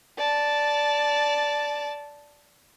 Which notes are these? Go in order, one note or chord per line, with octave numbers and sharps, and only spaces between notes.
D5 A5